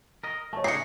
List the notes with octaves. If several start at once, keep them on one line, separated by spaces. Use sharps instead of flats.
A#4 D#5
A3 C#5 D#5 A5
A2 C#3 A3 D4 D#4 G#4 C7 C#7